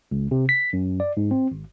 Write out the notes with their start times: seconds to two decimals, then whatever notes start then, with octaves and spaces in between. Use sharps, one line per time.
0.11 C#2
0.31 C3
0.49 B6
0.73 F#2
1.00 D5
1.17 G#2
1.31 C4
1.51 G#1